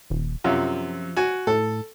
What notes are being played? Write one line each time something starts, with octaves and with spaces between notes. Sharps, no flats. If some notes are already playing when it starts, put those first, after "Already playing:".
D#1
F#2 C3 F3
F#4 G#5
A2 A4